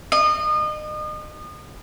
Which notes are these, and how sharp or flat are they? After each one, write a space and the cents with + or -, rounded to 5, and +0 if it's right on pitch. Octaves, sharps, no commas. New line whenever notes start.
D#5 -35